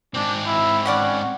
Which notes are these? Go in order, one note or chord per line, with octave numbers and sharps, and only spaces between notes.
G#2 C4 D4
E4
C#4 D5 F#5 B5